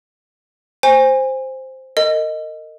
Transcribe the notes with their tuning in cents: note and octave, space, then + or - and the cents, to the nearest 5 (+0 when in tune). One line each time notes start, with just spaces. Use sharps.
C5 +0 G#5 -25
A#4 -35 D#5 +0